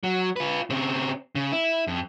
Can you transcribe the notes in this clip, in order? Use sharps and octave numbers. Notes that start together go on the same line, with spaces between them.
F#3
F4 B4
C#3 C4
C#3
E4
F2